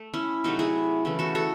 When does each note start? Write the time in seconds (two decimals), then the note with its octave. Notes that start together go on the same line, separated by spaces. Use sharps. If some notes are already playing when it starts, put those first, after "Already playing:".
Already playing: A3
0.14 C#4 E4
0.44 C3 F#3 A3 D#4 F#4
0.59 E4 G#4
1.05 C#3 E3 A3
1.19 F#4 A4
1.35 F#4 A4